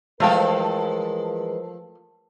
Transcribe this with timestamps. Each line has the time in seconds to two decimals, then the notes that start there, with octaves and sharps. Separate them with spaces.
0.20 E3 F3 G#3 A3 A4 A#4 F5 G5